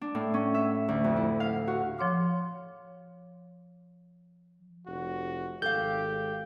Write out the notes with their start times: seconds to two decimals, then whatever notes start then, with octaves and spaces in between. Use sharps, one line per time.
0.01 D4
0.15 A2
0.34 C#4
0.54 E5
0.88 D2
1.04 F2
1.17 E4
1.40 F5
1.68 F#4
1.98 F3 C#5 C6 D6 F6
4.87 F1 F#4
5.62 G#1 G4 A4 F5 G6